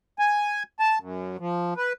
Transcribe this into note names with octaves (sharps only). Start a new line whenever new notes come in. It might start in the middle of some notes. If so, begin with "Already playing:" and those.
G#5
A5
F#2
F3
B4